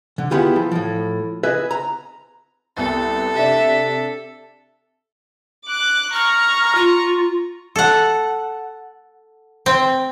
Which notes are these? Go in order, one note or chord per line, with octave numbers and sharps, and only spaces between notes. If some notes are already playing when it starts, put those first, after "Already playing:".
D3
B3 E4 F4 G4 G#4
F3
A2 F3
G#4 B4 D#5 E5
A#5
C2 B3 A4 A6
C3 D4 E5
D6 F#6
A#5 C#6 F6
F4
A4 F#5
C4